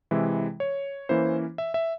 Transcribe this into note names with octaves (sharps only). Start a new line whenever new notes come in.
C3 E3 G#3 E4
C#5
E3 A#3 C#4 E4 C5
E5
E5